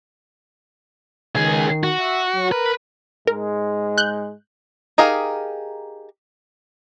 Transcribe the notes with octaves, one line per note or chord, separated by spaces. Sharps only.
C#2 D#3 G#4
F#4
E5
F#3
A#4 B4
G#2 G#3 A#4
F#6 G6
D#4 G4 G#4 A#4 F5